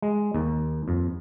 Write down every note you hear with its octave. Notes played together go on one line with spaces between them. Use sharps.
G#3
D#2
F2